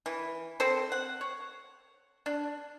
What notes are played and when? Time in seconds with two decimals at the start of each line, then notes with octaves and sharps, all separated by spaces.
0.06 E3
0.60 C4 A4 C5
0.92 F#5
1.21 C#5
2.26 D4